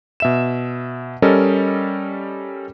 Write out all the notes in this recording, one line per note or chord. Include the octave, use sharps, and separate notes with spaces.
B2 E5 E7
G3 C#4 A4 A#4 D#5